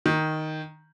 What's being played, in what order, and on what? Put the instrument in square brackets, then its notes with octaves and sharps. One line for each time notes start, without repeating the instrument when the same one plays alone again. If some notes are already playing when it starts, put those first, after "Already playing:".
[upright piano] D#3